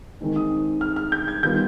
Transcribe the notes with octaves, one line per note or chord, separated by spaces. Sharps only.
D#3 G#3 C4 D#4
D#6
F6
F6
G6
G#6
D#3 G3 B3 F4 G6